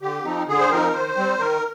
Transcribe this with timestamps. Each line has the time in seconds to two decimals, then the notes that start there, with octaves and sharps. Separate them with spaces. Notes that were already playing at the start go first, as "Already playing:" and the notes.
0.01 D3 G4
0.24 F3 C4 D#4
0.48 D3 G#4
0.59 C5
0.70 F3 C4 D#4 A#4
0.93 D#3 C5
1.16 G3 C4
1.39 D#3 A#4